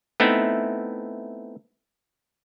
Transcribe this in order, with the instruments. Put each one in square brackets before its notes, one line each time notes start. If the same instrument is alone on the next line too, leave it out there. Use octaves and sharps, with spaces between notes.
[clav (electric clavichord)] A3 B3 C4 D#4 E4